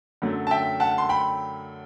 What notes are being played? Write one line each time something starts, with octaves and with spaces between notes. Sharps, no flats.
F#2 D3 F#3 A3
A5
E5 G5
F#5 A5
C6
G5 B5